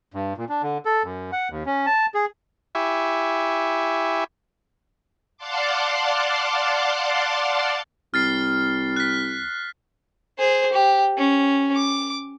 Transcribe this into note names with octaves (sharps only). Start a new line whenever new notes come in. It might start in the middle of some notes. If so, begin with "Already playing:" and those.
G2
A#2
D4
D3
A4
F#2
F#5
D#2
C#4
A5
G#4
E4 G4 E5 G#5 C#6
D5 F5 F#5 A5 C6 D6
C2 F6 A6 C7
F#6 B6
G#4 C5
G4
C#4
D6